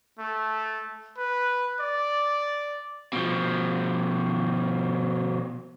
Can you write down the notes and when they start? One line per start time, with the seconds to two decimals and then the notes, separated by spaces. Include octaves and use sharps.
0.19 A3
1.18 B4
1.80 D5
3.13 B2 F3